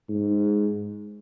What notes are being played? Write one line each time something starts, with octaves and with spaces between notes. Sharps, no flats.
G#2